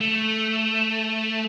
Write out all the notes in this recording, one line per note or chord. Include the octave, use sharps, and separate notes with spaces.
A3